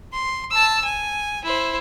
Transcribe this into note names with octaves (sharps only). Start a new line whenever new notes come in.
C6
A5 E6
G#5
E4 C5